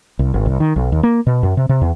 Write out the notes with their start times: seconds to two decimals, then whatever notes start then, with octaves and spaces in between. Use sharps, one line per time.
0.19 C2
0.34 G#1
0.46 C2
0.60 D#3
0.76 B1
0.92 D#2
1.03 A#3
1.27 B2
1.43 F#2
1.57 C3
1.69 C3
1.81 E2